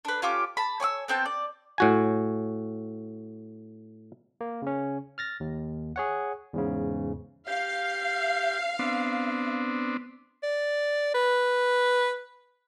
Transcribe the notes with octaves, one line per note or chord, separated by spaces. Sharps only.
D4 B4
C#4 F4 G4 D6
A5 B5
C#5 G#5 D6 E6
B3 C4 G5 A5
D5
A2 F#4 G#5
A#3
C#3 C#4
F6 A6 A#6
D#2
G#4 C#5 F#5
E2 G#2 C#3
G4 F5
B3 C4 D4
D5
B4